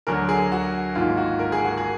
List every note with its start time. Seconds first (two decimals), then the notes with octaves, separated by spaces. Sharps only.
0.07 D2 D3 F#3 A#4
0.29 G#4
0.52 F#4
0.95 G#1 G#2 D#3 A#3 F4
1.17 F#4
1.39 A#4
1.52 G#4
1.65 F#4
1.77 G#4